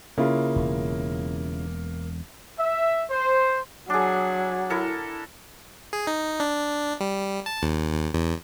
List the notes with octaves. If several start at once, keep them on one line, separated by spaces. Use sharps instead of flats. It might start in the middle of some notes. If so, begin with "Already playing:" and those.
C#3 A#3 E4 F4
E1
E5
C5
F#3 D4 G#4
E4 A4 A#4
G#4
D#4
D4
G3
A5
D#2
D#2
E2